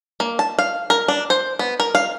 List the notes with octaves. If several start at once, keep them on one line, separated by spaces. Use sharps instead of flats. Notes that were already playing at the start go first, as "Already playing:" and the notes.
A#3
A5
F5
A#4
D4
C5
B3
A#4
F5